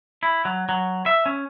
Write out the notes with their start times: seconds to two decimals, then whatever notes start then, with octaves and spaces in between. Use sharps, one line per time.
0.23 E4
0.45 F#3
0.69 F#3
1.06 E5
1.26 C#4